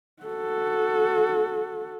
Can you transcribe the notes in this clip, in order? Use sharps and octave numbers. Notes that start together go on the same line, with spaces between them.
F#4 A4